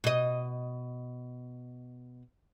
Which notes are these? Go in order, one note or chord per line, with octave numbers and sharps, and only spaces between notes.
B2 D#5